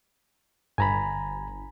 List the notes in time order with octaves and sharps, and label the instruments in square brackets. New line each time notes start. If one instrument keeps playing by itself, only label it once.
[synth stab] G1 [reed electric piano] G#5 A#5 B5